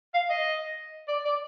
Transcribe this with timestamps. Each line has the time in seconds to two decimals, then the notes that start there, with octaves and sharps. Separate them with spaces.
0.14 F5
0.30 D#5
1.08 D5
1.25 D5